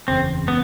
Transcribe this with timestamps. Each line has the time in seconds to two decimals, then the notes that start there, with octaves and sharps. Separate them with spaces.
0.08 F#1 E2 C#3 C4
0.48 B3